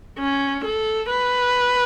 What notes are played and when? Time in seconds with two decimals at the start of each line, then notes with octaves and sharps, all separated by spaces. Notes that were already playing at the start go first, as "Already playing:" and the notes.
0.19 C#4
0.65 A4
1.10 B4